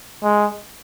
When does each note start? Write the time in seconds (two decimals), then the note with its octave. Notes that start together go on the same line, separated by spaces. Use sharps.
0.23 G#3